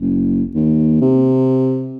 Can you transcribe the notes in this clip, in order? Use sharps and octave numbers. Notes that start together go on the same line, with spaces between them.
F#1
D#2
C3